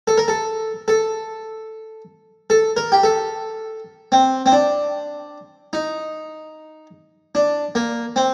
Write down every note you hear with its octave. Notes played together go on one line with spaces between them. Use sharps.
A4
A#4
A4
A4
A4
A#4
G4
A4
C4
C4
D4
D#4
D4
A#3
C4